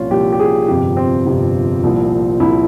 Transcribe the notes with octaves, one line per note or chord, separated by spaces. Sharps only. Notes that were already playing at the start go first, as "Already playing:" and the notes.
Already playing: C2 A#2 F3 C#4 F4
C2 A#2 F3 G4
G4
G#4
G1 F2 C3 F3 G4
C4
G1 F2 C3 F3
C2 A#2 F3
C2 A#2 F3 E4